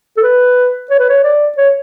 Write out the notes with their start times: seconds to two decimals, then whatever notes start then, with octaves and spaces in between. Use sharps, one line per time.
0.17 A4
0.23 B4
0.90 C#5
0.99 B4
1.09 C#5
1.24 D5
1.57 C#5